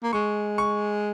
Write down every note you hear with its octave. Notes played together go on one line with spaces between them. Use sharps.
A#3
G#3 C#6
C#6